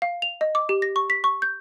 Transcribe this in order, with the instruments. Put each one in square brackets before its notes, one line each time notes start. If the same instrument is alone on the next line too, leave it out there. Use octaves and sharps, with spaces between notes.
[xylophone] F5
F7
D#5
D6
G4
A#6
C#6
B6
C#6
G6